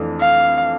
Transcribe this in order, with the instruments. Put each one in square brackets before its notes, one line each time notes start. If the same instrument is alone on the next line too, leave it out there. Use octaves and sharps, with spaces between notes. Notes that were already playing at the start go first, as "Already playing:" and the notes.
Already playing: [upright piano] F2 E3 A3 D4
[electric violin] F5